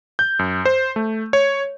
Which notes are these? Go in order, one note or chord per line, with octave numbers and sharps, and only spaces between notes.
G6
F#2
C5
A3
C#5